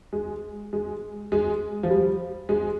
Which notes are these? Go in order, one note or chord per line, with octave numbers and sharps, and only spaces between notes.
G#3
G#3
G#3
F3
G3
G#3